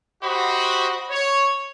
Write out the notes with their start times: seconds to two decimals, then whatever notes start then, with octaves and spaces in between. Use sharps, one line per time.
0.22 F#4 G4 C5 D#5 B5
1.10 C#5